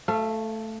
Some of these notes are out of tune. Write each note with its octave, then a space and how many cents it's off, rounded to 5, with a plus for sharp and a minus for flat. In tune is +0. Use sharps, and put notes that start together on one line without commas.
A3 +0 F5 -30